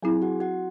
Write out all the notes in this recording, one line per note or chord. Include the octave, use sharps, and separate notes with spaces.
F#3 C4 E4 G#4 G#5
F#4 F#5
F#4 F#5